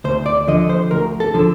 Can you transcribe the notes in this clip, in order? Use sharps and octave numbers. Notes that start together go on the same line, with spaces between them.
D2 C5
D5
D3 F3 D#5
C5
D2 A#4
A4
D3 F3 A4